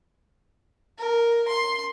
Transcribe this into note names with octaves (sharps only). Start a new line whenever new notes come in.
A#4
C6